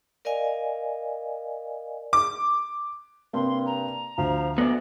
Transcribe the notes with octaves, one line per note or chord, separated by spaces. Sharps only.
A#4 D5 D#5 F5 G#5
D6
G2 C3 A#3 C6
A#5
D2 F3
D2 B3 D5 A#6